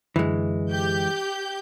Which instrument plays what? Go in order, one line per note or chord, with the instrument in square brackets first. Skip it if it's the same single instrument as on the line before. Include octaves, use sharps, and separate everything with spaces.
[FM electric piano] F#2 D3 [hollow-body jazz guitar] E3 G#3
[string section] G4 G6